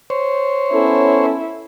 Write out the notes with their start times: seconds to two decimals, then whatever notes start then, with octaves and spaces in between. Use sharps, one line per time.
0.10 C5 C#5
0.72 B3 C#4 E4 A4